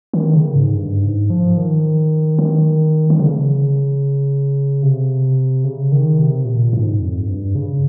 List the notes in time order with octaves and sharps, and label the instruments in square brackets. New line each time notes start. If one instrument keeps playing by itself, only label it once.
[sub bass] D#3
C#3
G#2
G2
G#2
F3
D#3
D#3
D#3
C#3
C3
C#3
D#3
C3
A#2
G#2
F2
G2
C#3